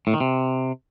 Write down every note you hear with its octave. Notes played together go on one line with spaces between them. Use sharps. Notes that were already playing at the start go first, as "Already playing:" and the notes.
A2
D#3
C3